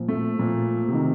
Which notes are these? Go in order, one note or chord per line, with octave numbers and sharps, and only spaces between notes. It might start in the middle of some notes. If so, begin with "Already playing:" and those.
Already playing: A#2 F3
A3
A#2 F3
C3 D#3